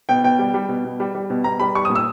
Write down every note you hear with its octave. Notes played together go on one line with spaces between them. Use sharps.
B2 G5
B2 G5
G3
G3
B2
B2
G3
G3
B2
B2 A#5
G3 B5
G3 C#6
D#6
A#2
E6